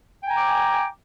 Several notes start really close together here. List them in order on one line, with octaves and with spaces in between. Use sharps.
G5 G#5 A#5 D6